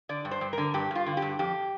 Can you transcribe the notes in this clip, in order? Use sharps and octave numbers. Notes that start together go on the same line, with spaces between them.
D3 D5
G2
C5
G2
D3 A#4
G2 G4
G2 F4
D3
G4
G2
F2 G4